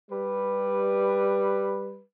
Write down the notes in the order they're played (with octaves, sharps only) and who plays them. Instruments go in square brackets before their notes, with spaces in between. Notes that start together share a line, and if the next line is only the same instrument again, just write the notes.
[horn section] G3 B4